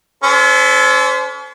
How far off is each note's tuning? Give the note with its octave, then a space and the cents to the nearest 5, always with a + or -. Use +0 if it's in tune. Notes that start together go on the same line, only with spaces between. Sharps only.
C#4 +40 A4 +0 C5 -20